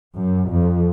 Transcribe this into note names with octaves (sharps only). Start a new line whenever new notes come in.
F#2
F2